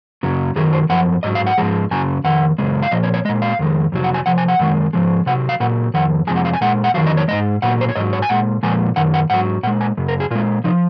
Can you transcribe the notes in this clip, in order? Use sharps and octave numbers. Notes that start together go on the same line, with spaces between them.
F#2 C#3 F#3
F#2 D#3 F#3 G#4
C5
F#2 F3 F#5
G#2 F#3 D#5
F5
F#5
G#2 F3 G#3
F#2 C#3 F#3 G#5
F2 D#3 F#5
F#2 C#3 G#3
F5
A#2 F3 D#5
C#5
C#5
A#2 G#3 D#5
F5
F2 D#3 G#3
F2 C3 F#3
F#5
G#5
C3 F3 F#5
G#5
F#5
F#2 D#3 G#3
G#2 F3 G#3
C3 F#3 F#5
F5
A#2 F#3 F#5
F2 D#3 F#5
F2 C3 F3 G#3 G#5
F#5
F5
G#5
A#2 G#3 F#5
F#5
F2 D#3 F#3 F5
D#5
C#5
G#2 D#3 G#3 D#5
A#2 F#3 F#5
C5
C#5
G#2 F#3 D#5
C#5
G#5
A#2 G#3 F#5
A#2 F3 G#3 G#5
F#2 D#3 F#5
F#5
G#2 F#3 F#5
A#2 G#3 F#5
G#5
F#2 C#3
A#4
G#4
A#2 G#3 F4
C3 F3 D#4